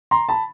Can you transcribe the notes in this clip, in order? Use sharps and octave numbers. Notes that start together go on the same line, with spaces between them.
A#5 C6
A5 B5